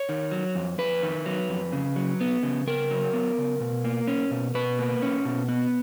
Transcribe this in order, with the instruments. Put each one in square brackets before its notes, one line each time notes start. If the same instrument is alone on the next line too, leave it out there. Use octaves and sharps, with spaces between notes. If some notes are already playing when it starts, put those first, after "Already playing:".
Already playing: [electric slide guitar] C#5
D#3
F#3
F2
F2 B4
D#3
F#3
F2
C#3
F#3
B3
C#3
C#3 A#4
F#3
B3
C#3
B2
A#3
C#4
B2
B2 B4
A#3
C#4
B2
B3